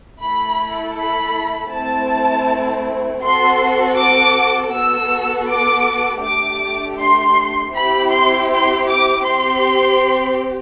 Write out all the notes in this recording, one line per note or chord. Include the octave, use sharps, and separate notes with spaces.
A3 E4 A4 B5
B5
A3 C4 E4 A5
C4 F#4 A4 C6
D6
B3 F#4 A4 E6
D6
A3 D4 G4 D6
C6
C4 E4 G4 B5
C6
C6
D6
C4 G4 C6